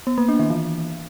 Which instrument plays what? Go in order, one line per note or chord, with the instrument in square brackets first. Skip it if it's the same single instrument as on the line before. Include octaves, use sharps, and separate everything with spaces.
[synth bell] B3
A#3
D4
D#3
E3